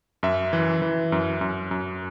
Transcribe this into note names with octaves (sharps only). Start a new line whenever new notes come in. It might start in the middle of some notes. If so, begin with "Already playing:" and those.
F#2 E5
E3
E3
F#2
F#2
F#2